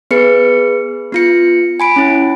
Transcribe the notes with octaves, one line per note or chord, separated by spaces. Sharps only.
B3 G#4 B4 C#7
B3 F4 C#7
G#5 B5 D7
C#4 E4